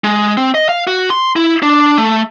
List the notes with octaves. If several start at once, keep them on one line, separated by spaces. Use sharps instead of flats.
G#3
C4
D#5
F5
F#4
C6
E4
D4
A3